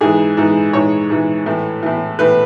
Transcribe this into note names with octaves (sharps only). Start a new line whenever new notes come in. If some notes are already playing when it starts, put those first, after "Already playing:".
G#2 E3 G#4
G#2 E3
G#2 E3 C#5
G#2 E3
A2 E3
A2 E3
A2 E3 B4